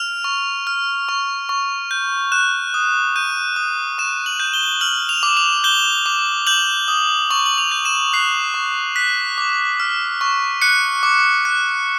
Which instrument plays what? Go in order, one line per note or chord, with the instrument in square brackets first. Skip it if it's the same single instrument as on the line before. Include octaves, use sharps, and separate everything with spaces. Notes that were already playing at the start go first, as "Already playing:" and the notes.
Already playing: [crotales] F6 F7
C#6
F6
C#6
C#6
G6
F#6 E7
D#6
G6 D#7
D#6
C#6 E7
F#7
G6
G7
F6 F#7
F7
D6
F7
G6 G7
D6
G6 F#7
D#6
C#6 F#7
F#7
F7
G6
E7
F#6 C7
C#6
F#6 B6
D6
F6
C#6
F#6 C#7
D6
F#6